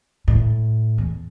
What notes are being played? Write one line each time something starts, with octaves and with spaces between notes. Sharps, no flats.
A2
E2